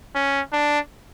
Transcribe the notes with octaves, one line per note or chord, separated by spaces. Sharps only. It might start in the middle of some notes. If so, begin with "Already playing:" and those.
C#4
D4